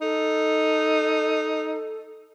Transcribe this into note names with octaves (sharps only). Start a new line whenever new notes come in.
D#4 A4